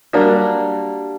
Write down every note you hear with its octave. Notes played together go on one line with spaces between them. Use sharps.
G3 A#3 D4 F#4